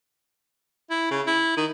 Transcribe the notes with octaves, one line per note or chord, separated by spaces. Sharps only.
E4
C#3
E4
D#3